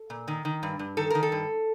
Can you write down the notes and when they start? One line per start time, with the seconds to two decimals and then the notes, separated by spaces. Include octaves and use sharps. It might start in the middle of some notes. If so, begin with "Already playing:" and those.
Already playing: A4
0.10 A#2
0.28 D#3
0.45 D#3
0.63 G2
0.79 G2
0.97 D#3 A4
1.11 D#3 A#4
1.23 A4
1.32 G2